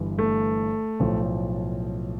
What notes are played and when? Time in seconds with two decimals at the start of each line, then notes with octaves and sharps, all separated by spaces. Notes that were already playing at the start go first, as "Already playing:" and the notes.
Already playing: G1 G2 E3
0.19 A3
1.00 B1 A2 F3